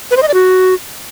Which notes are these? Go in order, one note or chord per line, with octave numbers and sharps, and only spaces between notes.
B4
C5
D#5
D5
F#4